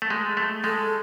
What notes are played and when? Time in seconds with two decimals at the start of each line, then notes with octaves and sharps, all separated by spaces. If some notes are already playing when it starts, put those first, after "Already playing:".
0.02 A3
0.10 G#3
0.37 A3
0.64 G#3 A4